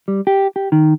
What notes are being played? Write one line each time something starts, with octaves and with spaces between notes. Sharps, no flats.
G3
G4
G4
D#3